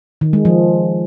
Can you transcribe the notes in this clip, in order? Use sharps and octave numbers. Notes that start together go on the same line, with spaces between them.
D#3
G#3
F3